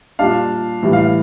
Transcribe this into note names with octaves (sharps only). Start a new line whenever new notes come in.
A#2 G3 D4 F5
A2 E3 G3
F5